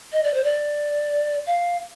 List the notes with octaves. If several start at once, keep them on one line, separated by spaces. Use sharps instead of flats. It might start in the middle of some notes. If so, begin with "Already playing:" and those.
D#5
D5
C5
D5
F5